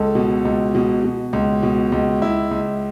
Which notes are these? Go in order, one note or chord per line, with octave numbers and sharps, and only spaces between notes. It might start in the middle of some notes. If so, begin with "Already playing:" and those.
Already playing: C#2 A4
B2
C#2
B2
B2
C#2
B2
C#2
C#2 E4
C#2